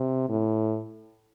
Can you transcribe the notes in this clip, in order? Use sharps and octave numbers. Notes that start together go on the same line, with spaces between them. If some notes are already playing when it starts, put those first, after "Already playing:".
Already playing: C3
A2